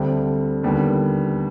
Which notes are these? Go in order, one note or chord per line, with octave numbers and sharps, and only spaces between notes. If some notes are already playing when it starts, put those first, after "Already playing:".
Already playing: D2 D3 G3 C4
D#2 D3 G3 B3